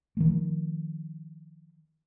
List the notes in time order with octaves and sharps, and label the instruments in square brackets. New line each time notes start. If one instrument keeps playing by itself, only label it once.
[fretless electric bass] D#3 F3 A3